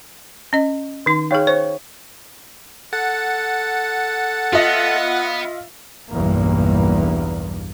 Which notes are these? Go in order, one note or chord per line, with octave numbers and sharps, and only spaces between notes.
C#4 D#5
D#3 D#4
D#4 G#4 C#5 F5 G5
C5 C#5
A4 F#5
B3 F4 D#5 E5
B1 E2 G2 A#3